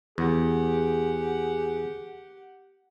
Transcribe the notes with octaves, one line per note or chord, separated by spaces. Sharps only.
E2 G4 G#4 F#5